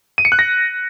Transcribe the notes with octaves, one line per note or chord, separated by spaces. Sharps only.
D#7
C#7
F#6
A#6